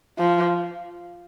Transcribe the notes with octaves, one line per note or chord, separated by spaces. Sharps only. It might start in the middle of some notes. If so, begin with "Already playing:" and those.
F3